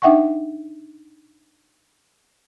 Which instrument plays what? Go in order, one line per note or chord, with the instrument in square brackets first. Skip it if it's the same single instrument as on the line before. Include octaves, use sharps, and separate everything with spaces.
[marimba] D4 D#4 E5 F#5 G5 C#6